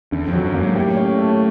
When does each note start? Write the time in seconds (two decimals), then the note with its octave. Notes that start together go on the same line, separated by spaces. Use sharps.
0.12 E2 D3
0.28 F2
0.33 F#3
0.44 F#2
0.54 A#3
0.60 G#2
0.76 A2 G4
0.97 C#4
1.19 A3